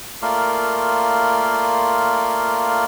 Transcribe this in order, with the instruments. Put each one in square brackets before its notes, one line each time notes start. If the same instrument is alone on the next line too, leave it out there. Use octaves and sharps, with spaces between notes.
[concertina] A3 A#3 F4 A#4 D5 C6